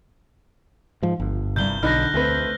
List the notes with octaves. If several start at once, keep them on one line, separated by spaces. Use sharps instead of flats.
G#2 F3
G1
C2 G2 G6 G7
B1 D3 D#4 B5 F6 F#6 A#6
D2 A3 C4 B4